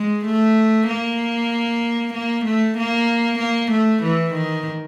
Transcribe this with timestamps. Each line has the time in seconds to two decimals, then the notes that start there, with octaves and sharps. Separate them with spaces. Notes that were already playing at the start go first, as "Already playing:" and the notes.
Already playing: G#3
0.25 A3
0.88 A#3
2.14 A#3
2.45 A3
2.78 A#3
3.39 A#3
3.71 A3
4.03 E3
4.34 D#3